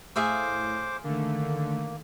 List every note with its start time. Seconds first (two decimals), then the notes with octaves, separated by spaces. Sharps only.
0.16 A2 G#4 C5 E5 F5 D6
1.04 D3 D#3 A3 A#3